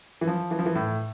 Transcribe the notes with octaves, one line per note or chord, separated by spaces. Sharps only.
E3
F3
E3
F3
E3
A2